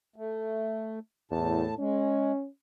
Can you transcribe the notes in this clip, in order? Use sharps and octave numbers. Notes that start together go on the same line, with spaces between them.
A3
E2 A2 A5
G#3 C#4